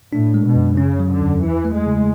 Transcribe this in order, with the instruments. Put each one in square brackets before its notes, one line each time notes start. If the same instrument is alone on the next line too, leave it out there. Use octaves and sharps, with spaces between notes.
[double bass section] A2 [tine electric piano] D4
[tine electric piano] G#3
[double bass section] B2
[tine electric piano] F#2
[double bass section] C#3 [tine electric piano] C#4
[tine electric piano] F#3
[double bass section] D3
[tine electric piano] E2
[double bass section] E3 [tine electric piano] E4
[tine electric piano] A3
[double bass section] G#3
[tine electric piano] C#3